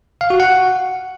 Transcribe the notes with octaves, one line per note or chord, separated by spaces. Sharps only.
F5
F#4
F#5